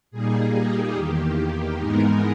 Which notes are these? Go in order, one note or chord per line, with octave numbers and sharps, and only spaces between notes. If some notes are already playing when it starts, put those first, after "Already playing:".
A#2 G3 A#3 D#4 G#4
G4
E2 D#3 A#3 G4
G#2 E3 G#3 B3 D#4 A#4